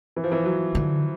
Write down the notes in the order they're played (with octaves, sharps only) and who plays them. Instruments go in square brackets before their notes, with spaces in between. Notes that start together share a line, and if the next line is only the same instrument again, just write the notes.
[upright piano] E3
F3
E3
F#3
[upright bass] D3